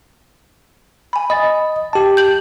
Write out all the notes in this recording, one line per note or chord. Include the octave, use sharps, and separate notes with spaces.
G#5 B5
D#5 B5 A6
G4 A5
G6 F#7